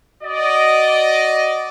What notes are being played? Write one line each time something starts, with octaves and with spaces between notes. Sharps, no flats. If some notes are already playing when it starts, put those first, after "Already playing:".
F#4 D5 D#5